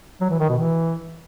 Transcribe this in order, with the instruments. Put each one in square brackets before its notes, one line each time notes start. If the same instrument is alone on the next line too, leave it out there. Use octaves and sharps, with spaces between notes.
[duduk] F#3
E3
D#3
B2
E3